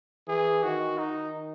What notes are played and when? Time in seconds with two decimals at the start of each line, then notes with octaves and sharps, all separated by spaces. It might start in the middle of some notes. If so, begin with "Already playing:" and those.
0.28 E3 G#4
0.63 D#3 F#4
0.98 D#3 D#4